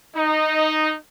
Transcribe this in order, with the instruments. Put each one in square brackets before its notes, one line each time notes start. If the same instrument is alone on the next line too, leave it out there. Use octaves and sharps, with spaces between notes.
[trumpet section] D#4